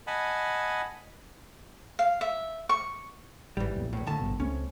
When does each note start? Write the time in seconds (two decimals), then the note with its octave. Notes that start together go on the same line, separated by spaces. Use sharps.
0.07 D#5 F#5 G#5 A5 B5
1.99 F5
2.21 E5
2.69 C#6
3.57 A1 G#2 E3 G3
3.75 B1 F2 A#2
3.93 E2 A2
4.07 C2 A2 D3 A5
4.20 G#1 G2 B2
4.40 C#2 A3 C4 C#4